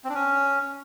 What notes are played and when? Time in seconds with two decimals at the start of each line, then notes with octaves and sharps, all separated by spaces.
0.04 C4
0.09 D4
0.15 C#4